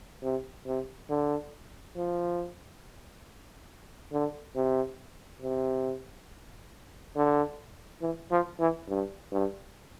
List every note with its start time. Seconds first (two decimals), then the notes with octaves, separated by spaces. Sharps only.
0.23 C3
0.66 C3
1.10 D3
1.96 F3
4.12 D3
4.56 C3
5.42 C3
7.16 D3
8.02 E3
8.31 F3
8.60 E3
8.88 G2
9.32 G2